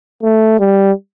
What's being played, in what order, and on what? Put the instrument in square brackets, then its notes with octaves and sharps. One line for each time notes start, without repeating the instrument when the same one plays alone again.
[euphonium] A3
G3